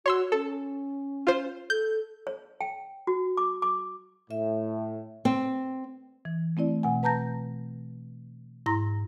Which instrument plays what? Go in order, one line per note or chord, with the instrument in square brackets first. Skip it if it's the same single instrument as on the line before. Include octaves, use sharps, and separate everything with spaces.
[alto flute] F#4 [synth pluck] C#5 C6 E6
[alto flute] C#4 [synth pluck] A4
[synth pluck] F4 C5
[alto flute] A4 [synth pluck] G6
[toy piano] C#5
G5
F#4
D6
D6
[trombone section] A2 [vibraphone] E5
[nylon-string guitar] C4
[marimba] E3
A3 C4 E4 D5
B2 F#5 G#5
B4 A5 A#5 G6 A#6
G#2 E4 A#5 C6 A#6